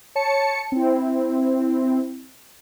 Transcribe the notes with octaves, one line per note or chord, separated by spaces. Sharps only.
C#5 A5 C#7
C4 E4